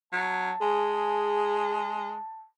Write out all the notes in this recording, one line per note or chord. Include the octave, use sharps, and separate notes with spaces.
F#3 A5
G#3 G#4